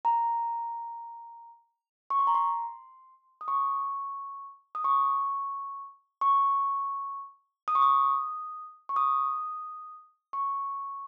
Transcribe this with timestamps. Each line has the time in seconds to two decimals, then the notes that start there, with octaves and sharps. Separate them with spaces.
0.05 A#5
2.10 C#6
2.19 C6
2.27 A#5
2.35 C6
3.41 D#6
3.48 C#6
4.75 D#6
4.84 C#6
6.21 C#6
7.68 D#6
7.75 C#6
7.82 D#6
8.89 C#6
8.96 D#6
10.33 C#6